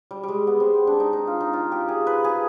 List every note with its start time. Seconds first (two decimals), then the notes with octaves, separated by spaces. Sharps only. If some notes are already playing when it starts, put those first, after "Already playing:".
0.11 G3
0.23 G3 G#3
0.47 B3
0.60 C4
0.74 C4
0.87 D4
1.00 D#4
1.13 D#4
1.27 F4
1.41 D#4
1.53 F4
1.72 G4
1.88 G#4
2.07 B4
2.24 G#4